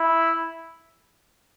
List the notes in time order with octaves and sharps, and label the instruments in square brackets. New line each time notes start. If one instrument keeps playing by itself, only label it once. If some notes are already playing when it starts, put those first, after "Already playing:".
Already playing: [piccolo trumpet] E4